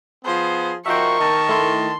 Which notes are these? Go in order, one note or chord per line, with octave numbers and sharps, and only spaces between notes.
F3 B3 G#4 C5
F3 D#4 F#4 A#4 C5 E5 G5 C#6
D#3 A5
A3 E4 C6